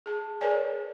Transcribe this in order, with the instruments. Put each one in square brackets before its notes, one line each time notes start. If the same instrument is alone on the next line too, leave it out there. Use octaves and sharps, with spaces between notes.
[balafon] G#4 A5
G#4 A#4 B4 C#5 D5 G#5